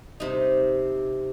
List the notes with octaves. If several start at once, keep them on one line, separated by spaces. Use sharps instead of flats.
C3 D#4